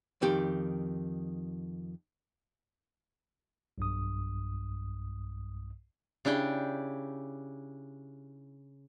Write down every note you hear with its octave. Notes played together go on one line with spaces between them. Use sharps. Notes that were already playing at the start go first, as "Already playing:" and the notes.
F2 D#3 G4
B1 G2 D#6
C#3 D4 E4 G4 G5